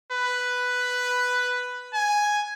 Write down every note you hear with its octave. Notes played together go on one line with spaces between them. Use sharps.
B4
G#5